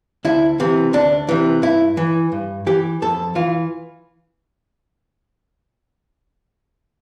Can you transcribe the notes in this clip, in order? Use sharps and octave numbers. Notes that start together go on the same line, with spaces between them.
D2 E4
C3 E3
D2 D4
C3 E3
G2 E4
E3
G2
E3 G4
F2 A4
E3 F4